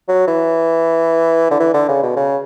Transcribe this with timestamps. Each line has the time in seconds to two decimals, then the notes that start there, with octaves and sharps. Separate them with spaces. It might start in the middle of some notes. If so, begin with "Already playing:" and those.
0.08 F#3
0.27 E3
1.51 D3
1.60 E3
1.74 D3
1.88 C#3
2.03 B2
2.17 C#3